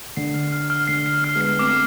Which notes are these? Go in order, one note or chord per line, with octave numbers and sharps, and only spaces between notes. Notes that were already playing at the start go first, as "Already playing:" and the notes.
D3 C7
F6
F6
F6
D3 C7
C7
F6
G#3 B3
C7
A3 C4 D6